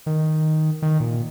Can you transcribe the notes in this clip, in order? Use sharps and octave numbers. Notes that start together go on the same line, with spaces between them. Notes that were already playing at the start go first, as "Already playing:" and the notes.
D#3
D#3
A#2